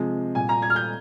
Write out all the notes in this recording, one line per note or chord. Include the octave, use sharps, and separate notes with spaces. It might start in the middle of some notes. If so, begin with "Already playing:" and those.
Already playing: C3 F3 G#3
A#2 G3 G#5
A#5
G#6
F6
G6